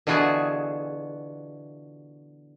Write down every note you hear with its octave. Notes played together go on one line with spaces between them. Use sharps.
B2 D3 E3 F4 F#4 G#4